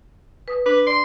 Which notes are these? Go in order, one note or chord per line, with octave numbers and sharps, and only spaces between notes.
B4 D#6
D4 B4
D5 C6